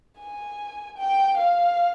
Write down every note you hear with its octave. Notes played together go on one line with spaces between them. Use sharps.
G#5
G5
F5